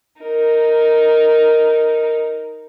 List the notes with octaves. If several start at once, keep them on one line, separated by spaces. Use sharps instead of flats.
D#4 A#4